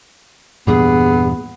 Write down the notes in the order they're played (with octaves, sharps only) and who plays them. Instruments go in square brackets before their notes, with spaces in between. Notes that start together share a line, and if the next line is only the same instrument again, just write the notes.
[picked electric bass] E2 G2 A#2 [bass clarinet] B3 [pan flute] G#4